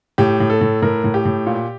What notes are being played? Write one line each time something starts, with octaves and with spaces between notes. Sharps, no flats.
A2 G4
A2
A4
A2
A2 A#4
A2
G4
A2
A#2